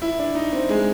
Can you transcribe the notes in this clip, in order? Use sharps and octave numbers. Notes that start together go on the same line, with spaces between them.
E4
D4
D#4
C4
G#3